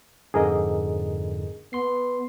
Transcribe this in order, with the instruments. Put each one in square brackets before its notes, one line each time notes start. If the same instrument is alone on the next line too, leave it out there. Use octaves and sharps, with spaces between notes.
[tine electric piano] F2 G#2 D3 [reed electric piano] G#4 A#4 D#5
[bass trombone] B3 [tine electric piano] C6 C7